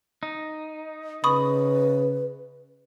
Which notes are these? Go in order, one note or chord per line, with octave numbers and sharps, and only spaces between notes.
D#4
C#3 B4 B5 C#6 D#6